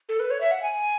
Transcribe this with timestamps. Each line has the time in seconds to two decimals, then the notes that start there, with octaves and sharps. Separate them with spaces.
0.09 A4
0.20 B4
0.31 C#5
0.41 E5
0.51 F#5
0.63 G#5